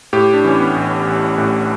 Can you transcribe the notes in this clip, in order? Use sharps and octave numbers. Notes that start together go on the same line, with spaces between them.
A2 G4
D4
E3 C#4
B3
A1
A1
A2